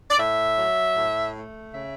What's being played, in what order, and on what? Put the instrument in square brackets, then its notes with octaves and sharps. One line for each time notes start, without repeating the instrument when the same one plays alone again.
[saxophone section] D5
A2 E5
F#3
A2
A3
C#3 E5